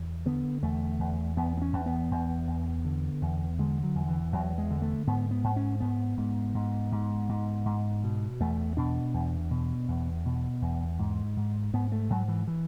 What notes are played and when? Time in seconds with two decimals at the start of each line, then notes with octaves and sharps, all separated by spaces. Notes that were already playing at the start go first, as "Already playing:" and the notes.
Already playing: E2
0.26 D3 B3
0.62 E2 A3
0.99 E2
1.37 E2 B3
1.57 B3
1.62 C#4
1.73 E2
1.86 B3
2.11 E2
2.48 E2
2.85 D3
3.22 E2
3.59 D3 G#3
3.83 F#3
3.95 E2
4.08 E3
4.33 E2 F#3
4.58 G#3
4.70 D3
4.82 A3
5.07 G#2 B3
5.31 B3
5.44 G#2
5.56 C#4
5.80 G#2 B3
6.17 G#2
6.54 G#2
6.92 G#2
7.29 G#2
7.65 G#2
8.04 B2
8.40 E2 A3
8.77 B2 D4
9.14 E2
9.51 B2
9.88 E2
10.25 B2
10.62 E2
10.99 G#2
11.37 G#2
11.73 G#2 B3
11.92 A3
12.10 G#2 F#3
12.28 E3
12.47 E3